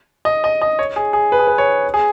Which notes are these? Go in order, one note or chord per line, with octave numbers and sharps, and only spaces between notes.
D#5
D#5
D#5
C#5
G#4
G#4
B4
G#4
B4
C#5
G#4